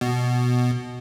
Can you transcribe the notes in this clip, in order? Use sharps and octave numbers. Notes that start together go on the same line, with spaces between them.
B2